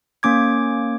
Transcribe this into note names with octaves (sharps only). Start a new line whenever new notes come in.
A#3 C#4 D6 G#6